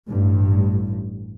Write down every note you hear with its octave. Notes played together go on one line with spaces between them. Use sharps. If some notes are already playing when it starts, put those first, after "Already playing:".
A1 G2